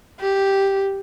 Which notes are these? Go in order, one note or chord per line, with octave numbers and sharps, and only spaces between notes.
G4